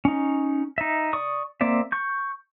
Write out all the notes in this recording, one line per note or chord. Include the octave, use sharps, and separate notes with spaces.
C#4 D#4
D#4 E5
D5 C#6 D#6
A#3 C4 D5 E5
C#6 G6